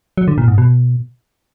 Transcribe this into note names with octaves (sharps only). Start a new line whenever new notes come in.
F#3
D3
A#2
G#2
B2